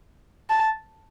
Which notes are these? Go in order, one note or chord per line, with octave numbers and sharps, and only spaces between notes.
A5